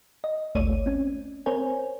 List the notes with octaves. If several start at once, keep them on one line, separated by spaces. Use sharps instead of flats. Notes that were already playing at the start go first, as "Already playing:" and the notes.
D#5
G#1 D2 A3 C#5 D5 D#7
C4 C#4
C4 A#4 C5 C#5 G#5